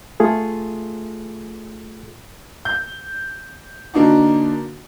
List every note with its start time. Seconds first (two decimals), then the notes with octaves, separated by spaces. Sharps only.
0.20 A3 F4 G#4 A4
2.65 G6
3.94 D3 A#3 D4 D#4 F#4